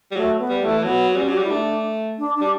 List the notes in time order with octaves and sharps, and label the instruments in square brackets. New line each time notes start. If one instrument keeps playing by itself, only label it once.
[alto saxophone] G3
[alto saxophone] F#3 [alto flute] A3
[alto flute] B3
[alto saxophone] G3
[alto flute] A3
[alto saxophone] E3
[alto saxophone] F#3 [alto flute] B3
[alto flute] B3
[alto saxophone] G3 [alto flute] C#4
[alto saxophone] F#3 [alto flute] G4
[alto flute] F#4
[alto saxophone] G3 [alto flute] E4
[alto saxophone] A3 [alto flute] D4
[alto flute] D4
D4
[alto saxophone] G3